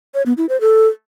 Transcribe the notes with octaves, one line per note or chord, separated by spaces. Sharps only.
C#5
B3
E4
C5
A4